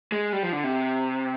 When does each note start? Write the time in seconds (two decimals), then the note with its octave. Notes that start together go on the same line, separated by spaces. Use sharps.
0.12 G#3
0.33 G3
0.43 F3
0.53 D3
0.64 C3